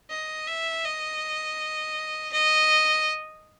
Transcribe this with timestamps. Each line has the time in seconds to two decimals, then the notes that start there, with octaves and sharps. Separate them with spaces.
0.10 D#5
0.47 E5
0.85 D#5
2.33 D#5